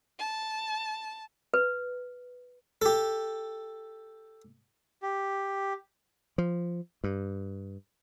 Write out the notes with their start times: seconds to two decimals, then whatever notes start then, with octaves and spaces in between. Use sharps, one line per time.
0.19 A5
1.54 B4
2.82 G4 A4
5.02 G4
6.38 F3
7.04 G2